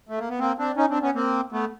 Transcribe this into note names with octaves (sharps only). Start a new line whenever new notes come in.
A3
A#3
B3
A#3 C4
C4 D4
C#4 D#4
C4 D4
B3 C#4
A#3 C4
A3 B3